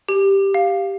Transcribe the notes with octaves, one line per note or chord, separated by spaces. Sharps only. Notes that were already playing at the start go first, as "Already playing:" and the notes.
G4
F5